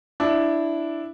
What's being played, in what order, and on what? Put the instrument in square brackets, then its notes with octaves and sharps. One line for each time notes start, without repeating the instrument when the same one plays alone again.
[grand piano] D4 E4